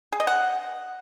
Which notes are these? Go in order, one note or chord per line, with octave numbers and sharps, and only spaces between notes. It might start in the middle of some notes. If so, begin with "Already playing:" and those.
G#4
D#5
F#5